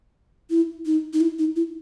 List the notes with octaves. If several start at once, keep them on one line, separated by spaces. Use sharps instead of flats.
E4
D#4
D#4
E4
D#4
E4